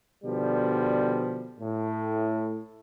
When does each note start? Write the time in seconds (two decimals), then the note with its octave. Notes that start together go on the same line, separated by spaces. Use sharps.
0.24 B2 D3 F3 G3
1.60 A2